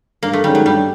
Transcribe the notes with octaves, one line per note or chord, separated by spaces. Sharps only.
G2 A#3
A3
D#3 G3 G#3 C#4
F#3
G2 G3